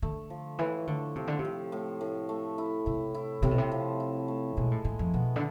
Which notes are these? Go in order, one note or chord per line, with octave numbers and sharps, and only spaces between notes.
D3 A3
F3
A2 E3
D3 A3
C3 F3
D3
C3
F3
A2
A2
A3
E4
C3 E4
E4
A2 C3
B2
C3
F3
E4
A3
B2 G#3
A2
A2 G#3
F2
B2 B3
D3